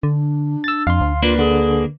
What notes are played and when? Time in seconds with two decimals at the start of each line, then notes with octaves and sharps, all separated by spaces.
0.03 D3 D4
0.64 E6 A6
0.87 F2 F5 C6
1.01 D2
1.22 A#3 D4 F4 B4
1.39 D3 G#4